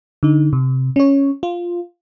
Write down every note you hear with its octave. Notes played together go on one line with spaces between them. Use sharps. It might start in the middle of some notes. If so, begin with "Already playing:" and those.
D3 D#4
C3
C#4 C#5
F4